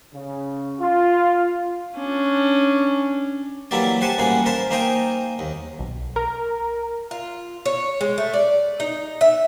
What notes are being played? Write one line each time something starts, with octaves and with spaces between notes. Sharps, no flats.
C#3
F4
C#4 D4
E3 F#3 A#3 E4 G4 D5
G4 C5 F#5 G#5 A5
A1 G3 G#3 A#3 F#4 G#4
A#4 C5 F5 A5 B5
A#3 D#4 C5 D#5 G5 G#5
D#2
B1
A#4
F4
C#5
G#3
A3
D5
D#4
E5